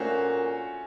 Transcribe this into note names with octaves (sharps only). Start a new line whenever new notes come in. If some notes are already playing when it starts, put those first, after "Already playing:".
Already playing: A#2 A3 C#4 F#4 C5